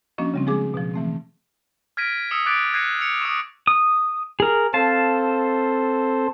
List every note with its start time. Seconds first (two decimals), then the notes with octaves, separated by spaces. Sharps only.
0.18 F3 A#3 C#4 D4 F#4 D#5
0.34 C#3 G3 C4
0.46 F3 G#3 G#4 D6
0.74 B2 F3
0.94 E3 A3 C4
1.97 F6 G#6 A#6 B6 D7 D#7
2.31 D#6 E6 C#7 E7 F7
2.46 D6 F#6 G#6 A6 B6 D7
2.74 F#6 G#6 A#6 C7 C#7 D#7
3.01 C#7 F7
3.21 C#6 D#6
3.67 D#6
4.40 G#4 A#4
4.74 C4 A4 C5 F5 A5